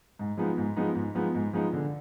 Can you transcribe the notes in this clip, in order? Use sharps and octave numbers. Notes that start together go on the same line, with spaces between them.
G#2
F3 G#3 B3 D#4
G#2
F3 G#3 B3 D#4
G#2
F3 G#3 B3 D#4
G#2
F3 G#3 B3 D#4
D3